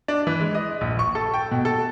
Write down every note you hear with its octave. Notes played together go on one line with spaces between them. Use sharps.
D4
E3
G#3
D#5
A#1
C#6
A4
G5
B2
A4